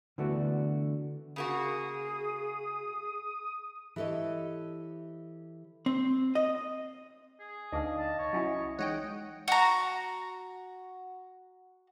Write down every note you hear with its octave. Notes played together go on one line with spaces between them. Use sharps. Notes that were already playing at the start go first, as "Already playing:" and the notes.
D3 E3 A3 B3 D4 F#4
C#3 A#3 F#4 G#4 D#6
E3 G4 A4 C#5 D#5
C4
D#5
G#4
D2 D4 D#4 D#5 F5
A5
C2 C#5
F#3 C#4 E4
E3 G#3 D#4 C#5 D#5 F#5 G5
F#4 A#5